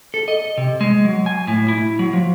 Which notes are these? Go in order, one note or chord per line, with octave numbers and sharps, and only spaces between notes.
A4
D#5
C3
G#3
F#3
G#5
A2
E4
F#3
F3